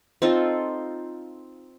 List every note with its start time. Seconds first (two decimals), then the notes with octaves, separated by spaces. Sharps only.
0.22 C4 D#4 F4 A4